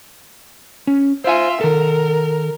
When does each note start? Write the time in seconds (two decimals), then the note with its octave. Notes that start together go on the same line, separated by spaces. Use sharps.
0.87 C#4
1.24 F4 C5 E5 G#5
1.61 D#3 A4 A#4